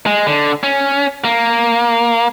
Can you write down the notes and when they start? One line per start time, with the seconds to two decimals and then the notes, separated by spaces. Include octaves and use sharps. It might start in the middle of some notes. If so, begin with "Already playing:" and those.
0.06 G#3
0.27 D3
0.63 C#4
1.25 A#3